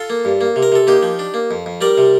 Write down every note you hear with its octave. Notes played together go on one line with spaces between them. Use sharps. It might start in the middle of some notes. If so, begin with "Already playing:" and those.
Already playing: F4 A4
A#3
G2
A#3
C3
A#4
C3 A4
A#3 D#4 G4
F3
D4
A#3
F2
F2
G3 A#4 D5
C3